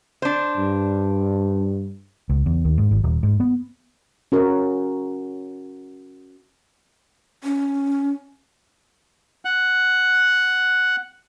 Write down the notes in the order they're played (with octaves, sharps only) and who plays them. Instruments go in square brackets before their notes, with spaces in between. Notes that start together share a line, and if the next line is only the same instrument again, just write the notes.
[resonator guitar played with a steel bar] D4 C5
[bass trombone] G2
[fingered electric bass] C#2
E2
D#2
G#2
G#1
D#1
G#2
B3
[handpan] C#4 F#4 A#4
[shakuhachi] C#4
[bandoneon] F#5 F#6